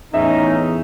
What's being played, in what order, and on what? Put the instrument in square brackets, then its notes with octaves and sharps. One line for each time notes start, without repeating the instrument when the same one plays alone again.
[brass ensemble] E2 [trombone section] A2 C#4 D#4 [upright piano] E5